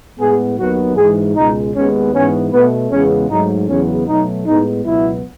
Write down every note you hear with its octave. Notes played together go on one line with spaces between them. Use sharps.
A2 G#3 B3 G#4
D#2 D#3 F#3 B3 F#4
G#2 E3 G#3 G#4
C#2 B2 G#3 D#4
D#2 D#3 G#3 B3 C#4
G#2 E3 B3 C#4
B2 A3 B3
E2 C#3 G#3 B3 C#4
G#2 F#3 A3 D#4
E2 C#3 F#3 B3 C#4
B2 F#3 A3 D#4
A2 G#3 B3 D#4
C#2 B2 F#3 B3 E4